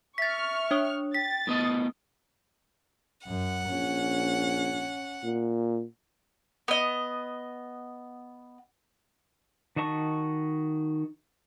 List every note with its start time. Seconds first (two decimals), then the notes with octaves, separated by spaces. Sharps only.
0.18 E5 C#6 F6 A6 B6
0.71 D4 C#5 D#6
1.14 G5 A6 B6
1.47 A2 B3 D#5 D#6
3.27 F#2 F#5
3.70 A#1 C#4
5.24 A#2
6.68 B3 D#5
9.76 D#3 F#4 D#5 A5 C#6